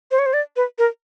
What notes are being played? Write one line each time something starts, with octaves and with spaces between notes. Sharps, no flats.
C5
C#5
C5
D5
B4
A#4